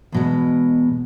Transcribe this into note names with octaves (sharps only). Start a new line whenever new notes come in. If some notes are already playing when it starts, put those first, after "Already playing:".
E2 B2 G#3